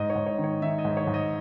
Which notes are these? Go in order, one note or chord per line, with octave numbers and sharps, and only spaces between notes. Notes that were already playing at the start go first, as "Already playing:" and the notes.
Already playing: G#2 D#5
C#5
G#2
C#5
D#3
C#5
D#3 E5
D#5
G#2
C#5
G#2
D#5